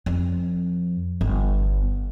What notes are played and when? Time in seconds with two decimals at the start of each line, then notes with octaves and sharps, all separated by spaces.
0.06 F2
1.21 G1